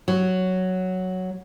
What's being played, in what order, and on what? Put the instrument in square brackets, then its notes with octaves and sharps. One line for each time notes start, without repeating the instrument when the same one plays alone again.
[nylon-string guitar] F#3